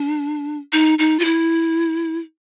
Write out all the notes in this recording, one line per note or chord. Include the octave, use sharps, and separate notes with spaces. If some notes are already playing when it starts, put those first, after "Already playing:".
Already playing: D4
D#4
D#4
F4
E4